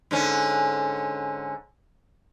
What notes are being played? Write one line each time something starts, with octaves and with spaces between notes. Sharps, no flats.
G#2 D3 C#4